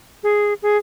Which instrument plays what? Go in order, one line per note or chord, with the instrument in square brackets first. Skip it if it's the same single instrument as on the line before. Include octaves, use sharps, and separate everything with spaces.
[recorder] G#4
G#4